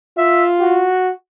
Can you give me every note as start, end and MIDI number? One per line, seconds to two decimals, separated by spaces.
0.18 0.90 65
0.18 0.45 76
0.61 1.12 66